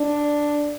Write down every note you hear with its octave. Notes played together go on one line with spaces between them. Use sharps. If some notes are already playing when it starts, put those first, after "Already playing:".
Already playing: D4